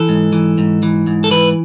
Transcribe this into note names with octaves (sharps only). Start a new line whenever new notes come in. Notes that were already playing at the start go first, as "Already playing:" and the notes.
Already playing: E3 A4
G#2
E3
G#2
E3
G#2
A4
E3 B4